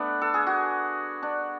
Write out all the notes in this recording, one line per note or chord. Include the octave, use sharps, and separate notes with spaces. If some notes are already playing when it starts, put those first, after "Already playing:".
Already playing: A3 B3 D4
A4
G#4
F#4
D4